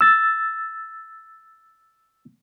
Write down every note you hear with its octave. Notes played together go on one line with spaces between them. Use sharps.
E6 A6